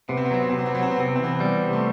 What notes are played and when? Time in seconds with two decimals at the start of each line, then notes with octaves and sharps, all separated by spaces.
0.09 C3 B3
0.17 C4
0.25 B3
0.31 F#3 C4
0.42 B3
0.50 C3 C4
0.58 B3
0.66 C4
0.75 F#3 B3
0.82 C4
0.91 B3
0.97 C3 C4
1.08 B3
1.16 C4
1.19 E3
1.24 B3
1.40 G3
1.62 C3
1.73 A3